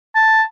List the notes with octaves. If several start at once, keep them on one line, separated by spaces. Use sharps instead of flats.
A5